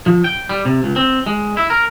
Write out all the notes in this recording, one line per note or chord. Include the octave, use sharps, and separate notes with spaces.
F3
G5
G3
C3
C#2
C4
G#3
E4
A#4